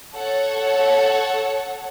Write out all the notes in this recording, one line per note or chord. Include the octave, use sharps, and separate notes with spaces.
A4 C#5 F#5